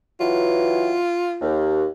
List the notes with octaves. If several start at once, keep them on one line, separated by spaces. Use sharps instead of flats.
E3 F#3 F4
D#2